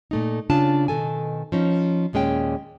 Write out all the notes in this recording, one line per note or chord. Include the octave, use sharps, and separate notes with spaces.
A#2 A3 D#4
C#3 D4 F4 A5
B2 D#3 A4 G#5
F3 C#4 D#4
D#2 A#2 G#3 C#4 G5